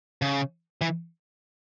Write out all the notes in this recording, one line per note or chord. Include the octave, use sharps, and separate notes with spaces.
C#3
E3